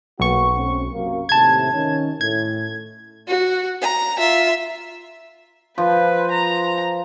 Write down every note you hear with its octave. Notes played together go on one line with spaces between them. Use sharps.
B1 A#3 B3 F#4 C#6
A3 C4 C#4
F#2 C3 A#3
D#2 A2 C3 A5 G#6
D#3 C#4
A2 G#6
F#4
A#5
F4 E5
F3 B4
A#5